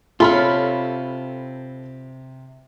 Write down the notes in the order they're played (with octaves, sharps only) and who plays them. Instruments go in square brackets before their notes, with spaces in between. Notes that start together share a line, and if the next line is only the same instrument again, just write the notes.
[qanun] C3 C#5 [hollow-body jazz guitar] F4 [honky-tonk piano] A4 B5 F6